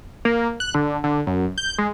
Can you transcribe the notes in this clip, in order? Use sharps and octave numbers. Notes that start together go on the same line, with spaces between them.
A#3
F#6
D3
D3
F#2
G6
G#3